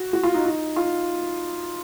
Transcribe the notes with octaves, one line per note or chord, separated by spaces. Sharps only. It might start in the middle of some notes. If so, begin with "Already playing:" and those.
Already playing: F#4
F#4
F4
D#4
D#4
F4